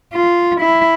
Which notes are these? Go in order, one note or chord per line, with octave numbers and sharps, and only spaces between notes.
F4
E4